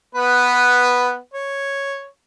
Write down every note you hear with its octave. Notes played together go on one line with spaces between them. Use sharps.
B3 B4
C#5